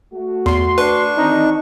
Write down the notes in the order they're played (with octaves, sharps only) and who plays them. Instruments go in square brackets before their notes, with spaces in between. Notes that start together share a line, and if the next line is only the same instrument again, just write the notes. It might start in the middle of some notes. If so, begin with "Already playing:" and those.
[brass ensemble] A3 F#4
[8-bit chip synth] E2 [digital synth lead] C6
[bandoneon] D4 C#6 [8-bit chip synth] B4
[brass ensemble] D#3 E3 C4 [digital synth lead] D#4